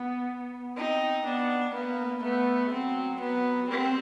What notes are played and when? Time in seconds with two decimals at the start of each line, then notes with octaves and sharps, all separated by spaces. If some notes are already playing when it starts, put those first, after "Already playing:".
Already playing: B3
0.76 C4 D#4
1.25 B3 D4
1.74 A#3 B3
2.22 A3 B3
2.72 F#3 C4
3.20 B3
3.69 G3 C4